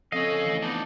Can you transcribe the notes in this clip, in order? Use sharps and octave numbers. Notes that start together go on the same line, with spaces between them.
F3 C4 C#4 A4 D#5 F5
E3 A3
B3 D4 D#4